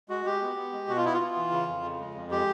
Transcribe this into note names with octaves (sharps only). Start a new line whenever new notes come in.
G#3 F#4
G#3 G4
B3
B3
G#3
B2 F#4
F4
B3 E4
F4
B3
E3
C#3
F2
C#3
G#3
F2
G#3 G4